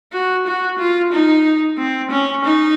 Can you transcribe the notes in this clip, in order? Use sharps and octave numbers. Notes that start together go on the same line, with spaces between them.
F#4
F#4
F4
D#4
C4
C#4
D#4